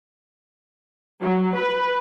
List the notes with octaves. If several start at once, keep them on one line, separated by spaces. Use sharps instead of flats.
F#3
B4